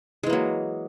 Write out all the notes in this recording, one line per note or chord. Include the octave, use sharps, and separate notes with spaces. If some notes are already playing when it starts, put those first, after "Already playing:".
E3 F#3 G#3 A#3